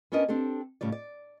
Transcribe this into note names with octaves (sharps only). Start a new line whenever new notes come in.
B3 C#4 D4 A#4 D#5
C4 D4 G4 A4
A2 C#3 G3 D5
D5